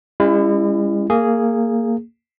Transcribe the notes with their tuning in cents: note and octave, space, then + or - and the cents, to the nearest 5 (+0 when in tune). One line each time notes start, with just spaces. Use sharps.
G#3 -45 C#4 +0 E4 +25
A#3 -15 G#4 +0